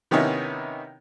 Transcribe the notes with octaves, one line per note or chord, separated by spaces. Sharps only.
C3 D#3 B3 C#4 D#4 E4